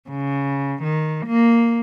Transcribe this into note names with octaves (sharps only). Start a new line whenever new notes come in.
C#3
D#3
A#3